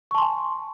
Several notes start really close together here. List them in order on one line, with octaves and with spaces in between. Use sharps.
C#6 A5 C6 G#5